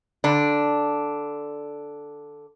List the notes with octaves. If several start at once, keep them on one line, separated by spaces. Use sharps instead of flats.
D3 D4